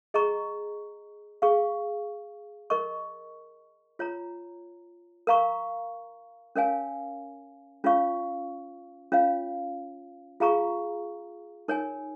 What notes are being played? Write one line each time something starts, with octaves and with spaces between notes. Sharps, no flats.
G#4 D#5 A#5 C#6
G#4 F5 C#6
A#4 D#5 C#6
F4 C#5 A#5
A#4 F5 A#5 C#6
C#4 A#4 C#5 F5 G#5
C#4 F4 C#5 F5 C#6
C#4 F4 C#5 F5
F4 G#4 F5 A#5 C#6
D#4 A#4 C#5 G#5